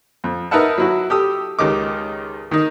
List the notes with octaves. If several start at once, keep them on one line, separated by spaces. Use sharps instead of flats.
F2
D#4 A#4 B4 E5 F#5 A5
F#3 E4 F#4
G4 A4 D#6
C#2 D#3 G4 D#5 D6
D#3 D#4